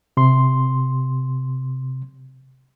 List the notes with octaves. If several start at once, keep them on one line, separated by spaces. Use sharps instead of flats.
C3 C6